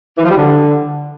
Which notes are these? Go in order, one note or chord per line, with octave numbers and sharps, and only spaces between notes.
E3
F3
G3
D3